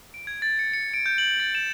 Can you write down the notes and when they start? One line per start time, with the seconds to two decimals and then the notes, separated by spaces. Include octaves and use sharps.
0.14 D7
0.27 G#6
0.42 A6
0.59 C#7
0.73 C#7
0.94 D7
1.06 G6
1.18 F#7
1.40 A6
1.55 E7